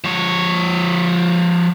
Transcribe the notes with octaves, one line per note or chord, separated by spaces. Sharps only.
F3 C#5